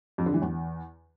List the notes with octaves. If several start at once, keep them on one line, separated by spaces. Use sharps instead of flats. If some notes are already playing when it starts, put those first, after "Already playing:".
F2
D3
E3
E2